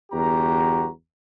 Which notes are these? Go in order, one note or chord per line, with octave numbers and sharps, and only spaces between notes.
G1 E2 F#4 G4 A#5